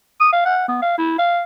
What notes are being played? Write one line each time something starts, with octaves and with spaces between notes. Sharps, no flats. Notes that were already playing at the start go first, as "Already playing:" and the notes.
D#6
F5
F#5
B3
F5
E4
F5